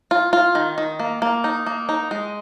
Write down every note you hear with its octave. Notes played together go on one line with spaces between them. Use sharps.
F4
F4
D#3
D#3
A#3
A#3
D#4
A#3
D#4
G#3